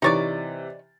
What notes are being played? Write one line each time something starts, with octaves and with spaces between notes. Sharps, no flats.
C3 E3 D#4 C#5 D5 A6